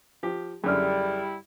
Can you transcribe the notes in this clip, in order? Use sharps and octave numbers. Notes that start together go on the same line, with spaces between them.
F3 G4
F#2 D3 G3 E4 G#4 D5 F6